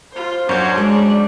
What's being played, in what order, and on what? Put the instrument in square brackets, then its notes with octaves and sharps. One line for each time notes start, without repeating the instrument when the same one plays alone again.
[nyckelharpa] F4 C5
[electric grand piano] F#2 G6 [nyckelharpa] D4 [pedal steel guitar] F#4 C5 C#5
[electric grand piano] G#3 [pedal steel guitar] D5